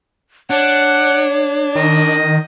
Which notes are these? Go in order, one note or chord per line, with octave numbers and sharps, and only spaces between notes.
D4 C#5 F#5
D#3 D#5